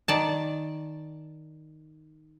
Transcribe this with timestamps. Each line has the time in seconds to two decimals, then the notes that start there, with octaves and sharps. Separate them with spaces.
0.08 D#3 D5 A5